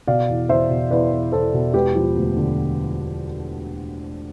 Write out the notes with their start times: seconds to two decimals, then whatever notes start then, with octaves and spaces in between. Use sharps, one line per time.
0.08 B2 D5 F5
0.29 E2
0.49 E2 C5 E5
0.70 B2
0.91 E2 B4 D5
1.11 E2
1.32 E2 A4 C5
1.53 B2
1.74 E1 G4 B4
1.95 F3
2.16 D2
2.37 D3